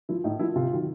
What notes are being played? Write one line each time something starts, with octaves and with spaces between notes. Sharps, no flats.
F3 E4
A2 D#4
F3 E4
C3 F4
D#3 F#3